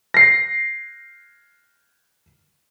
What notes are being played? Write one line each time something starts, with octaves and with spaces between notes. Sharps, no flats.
A#6 C7